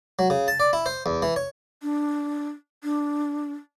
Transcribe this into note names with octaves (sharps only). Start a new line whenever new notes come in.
F#3
C#3
A5
D5
E4
C5
E2
E3
C#5
D4
D4